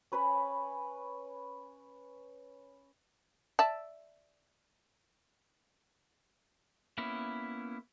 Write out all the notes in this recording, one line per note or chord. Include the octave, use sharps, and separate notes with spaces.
C#4 B4 C#5 B5
D5 E5 A5
A#3 B3 C#4 E4